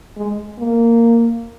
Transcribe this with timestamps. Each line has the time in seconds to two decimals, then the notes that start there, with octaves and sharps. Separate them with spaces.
0.16 G#3
0.59 A#3